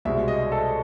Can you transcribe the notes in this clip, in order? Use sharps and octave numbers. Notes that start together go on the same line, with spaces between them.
C2 B2 G#3 E5
D#5
A4